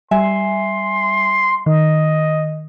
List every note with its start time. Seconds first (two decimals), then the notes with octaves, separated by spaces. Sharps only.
0.11 G3 E5 G#5 C6
1.66 D#3 D#5